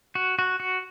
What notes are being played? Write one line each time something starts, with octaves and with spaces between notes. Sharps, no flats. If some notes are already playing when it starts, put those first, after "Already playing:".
F#4
F#4
F#4